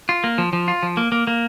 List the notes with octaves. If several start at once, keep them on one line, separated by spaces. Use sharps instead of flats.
F4
A#3
F3
F3
F4
F3
A#3
A#3
A#3